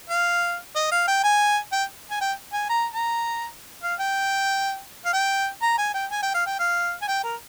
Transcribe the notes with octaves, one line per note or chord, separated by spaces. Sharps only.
F5
D#5
F5
G5
G#5
G5
G#5
G5
G#5
A#5
A#5
F5
G5
F5
G5
A#5
G#5
G5
G#5
G5
F5
G5
F5
G#5
G5
A#4